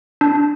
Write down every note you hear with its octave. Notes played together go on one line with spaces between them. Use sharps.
D4